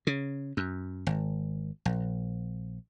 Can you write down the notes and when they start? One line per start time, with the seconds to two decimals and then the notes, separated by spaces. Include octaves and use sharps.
0.07 C#3
0.57 F#2
1.07 G#1
1.85 A#1